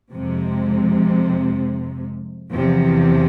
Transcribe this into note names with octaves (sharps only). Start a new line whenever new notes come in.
F2 C3 G#3
E2 C3 F3